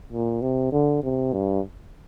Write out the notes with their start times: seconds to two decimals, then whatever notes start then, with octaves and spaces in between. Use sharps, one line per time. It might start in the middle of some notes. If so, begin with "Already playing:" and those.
0.12 A#2
0.42 C3
0.72 D3
1.03 C3
1.33 G2